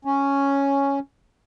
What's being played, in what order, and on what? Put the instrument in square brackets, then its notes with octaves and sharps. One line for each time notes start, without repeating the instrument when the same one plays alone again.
[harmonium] C#4